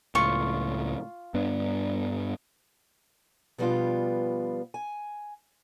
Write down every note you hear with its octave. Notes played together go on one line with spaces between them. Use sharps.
C#2 A2 F4 C#6
G2 B3 D4
B2 F3 G3 B3 D4 F4
G#5